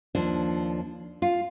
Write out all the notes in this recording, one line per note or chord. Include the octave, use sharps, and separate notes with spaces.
D#2 F3 D4
F4